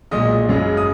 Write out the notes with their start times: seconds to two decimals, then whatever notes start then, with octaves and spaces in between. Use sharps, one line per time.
0.11 B1 A#2 G#3 D#5 D#6
0.49 F#1 F#2 C#3 G#3
0.77 D#6